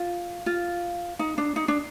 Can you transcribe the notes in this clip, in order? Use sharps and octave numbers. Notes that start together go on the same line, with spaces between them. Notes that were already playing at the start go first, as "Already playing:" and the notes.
Already playing: F4
F4
D#4
D4
D#4
D4